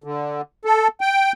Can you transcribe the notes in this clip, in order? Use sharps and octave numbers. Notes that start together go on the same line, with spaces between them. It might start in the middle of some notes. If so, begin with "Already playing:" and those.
D3
A4
G5